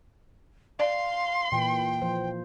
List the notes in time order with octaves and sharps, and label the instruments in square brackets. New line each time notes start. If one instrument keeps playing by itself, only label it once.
[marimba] D5 [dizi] F5 [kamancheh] C6
[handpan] A#2 E3 [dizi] G5
[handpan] F3 C5